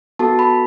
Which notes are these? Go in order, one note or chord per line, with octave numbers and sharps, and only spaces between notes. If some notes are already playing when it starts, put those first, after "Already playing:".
B3 F#4 A4 A5
B5